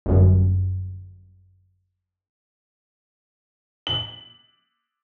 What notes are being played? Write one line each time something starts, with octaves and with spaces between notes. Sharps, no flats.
G1 F#2
F#7